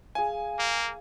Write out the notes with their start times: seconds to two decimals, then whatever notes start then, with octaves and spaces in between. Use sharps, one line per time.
0.15 G#4 F5 G#5
0.59 A#3